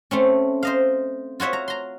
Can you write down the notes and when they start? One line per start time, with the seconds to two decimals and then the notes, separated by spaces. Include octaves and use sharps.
0.11 A3 C4 C#4
0.63 C5 D#5 F5
1.40 F4 F#4 C#5 E5
1.53 A#5
1.68 A#5 C6